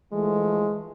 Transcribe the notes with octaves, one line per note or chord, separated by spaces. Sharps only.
E3 F3 G#3 A3